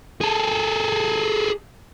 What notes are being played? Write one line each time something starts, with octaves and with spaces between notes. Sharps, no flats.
G#4 A4